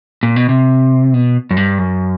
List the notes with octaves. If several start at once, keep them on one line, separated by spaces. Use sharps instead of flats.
A#2
B2
C3
B2
F#2
G2
F#2